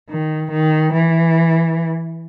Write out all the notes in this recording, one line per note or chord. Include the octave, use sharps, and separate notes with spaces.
D#3
D#3
E3